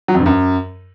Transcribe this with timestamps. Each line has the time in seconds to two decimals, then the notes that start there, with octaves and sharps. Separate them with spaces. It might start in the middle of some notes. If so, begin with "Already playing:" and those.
0.08 F#3
0.14 F2
0.20 G2
0.26 F#2